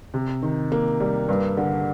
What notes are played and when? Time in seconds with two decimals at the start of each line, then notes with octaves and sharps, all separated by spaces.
0.14 C3
0.42 D#3
0.72 A#3
1.00 G3
1.29 G2
1.57 D3